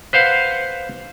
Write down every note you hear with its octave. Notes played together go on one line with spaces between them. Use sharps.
B4 C5 F5 F#5